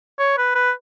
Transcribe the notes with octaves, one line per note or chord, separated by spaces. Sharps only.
C#5
B4
B4